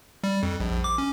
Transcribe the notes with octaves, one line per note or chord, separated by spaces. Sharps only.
G3
F2
A#1
A#1
D6
C#4